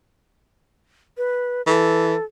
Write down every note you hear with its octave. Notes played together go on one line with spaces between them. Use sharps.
B4
E3 A4